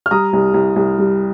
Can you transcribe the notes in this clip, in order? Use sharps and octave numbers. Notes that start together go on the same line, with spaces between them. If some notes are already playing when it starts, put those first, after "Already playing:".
F6
G3 A#5 D#6
C2
C2
C2
G3